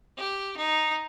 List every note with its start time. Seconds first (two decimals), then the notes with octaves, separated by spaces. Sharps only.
0.18 G4
0.57 D#4